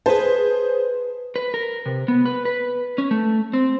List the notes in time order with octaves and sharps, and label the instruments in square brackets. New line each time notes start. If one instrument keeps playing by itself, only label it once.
[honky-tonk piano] G#4 C5 [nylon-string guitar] B4 A5
[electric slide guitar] B4
A#4
C3
B3
B4
B4
C#4
A3
C4